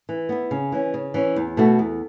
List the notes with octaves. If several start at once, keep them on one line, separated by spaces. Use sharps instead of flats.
E3
B3 E4
C#3
E3 C#4
C#3
E3 C#4
E2
B2 A3 F#4
E2